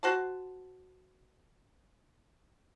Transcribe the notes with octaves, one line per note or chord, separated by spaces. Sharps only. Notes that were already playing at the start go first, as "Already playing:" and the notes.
F#4 C5 A5